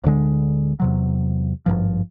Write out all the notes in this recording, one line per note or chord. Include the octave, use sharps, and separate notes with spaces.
D1 D2 D3 G#3
E2 C3 F#3
G#1 C#2 G2 F3